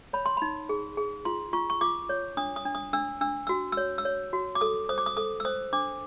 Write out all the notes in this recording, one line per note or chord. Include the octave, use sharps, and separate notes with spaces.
C#5 B5
C6
D#4 B5
G#4
G#4
F4 C6
F4 C#6
C#6
F4 D6
C#5
D4 D#6
D#6
D4
D#6
D4 E6
D4 E6
F#4 E6
C#5 E6
E6
C#5
F#4
D6
A4 D#6
C5 D#6
D6
D#6
A4 D#6
E6
C5 D#6
D4 D6